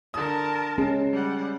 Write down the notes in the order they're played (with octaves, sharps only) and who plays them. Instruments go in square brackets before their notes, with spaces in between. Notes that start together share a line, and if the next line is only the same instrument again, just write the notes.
[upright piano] D3 D#6 [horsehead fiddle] A#4 A5
[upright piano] G#3 [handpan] C#4
[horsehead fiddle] G3 F#5